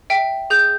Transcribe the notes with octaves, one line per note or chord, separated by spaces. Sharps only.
E5 G5
G#4 G6